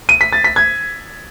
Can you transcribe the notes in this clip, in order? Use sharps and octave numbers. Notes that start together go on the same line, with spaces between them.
D#7
B6
A6
B6
G#6